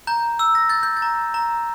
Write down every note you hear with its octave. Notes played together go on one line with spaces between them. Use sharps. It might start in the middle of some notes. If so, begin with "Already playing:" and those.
A#5 G6
E6
A#6
G6 A6
G6
A6
A#5
A#5